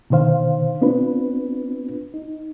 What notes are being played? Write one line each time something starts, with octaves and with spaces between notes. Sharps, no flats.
B2 D3 D#3 C5 F5
B3 C4 D4 F4 B4
D#4